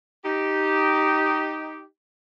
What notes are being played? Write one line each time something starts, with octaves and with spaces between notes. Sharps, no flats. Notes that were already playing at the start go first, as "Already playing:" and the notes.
D#4 G4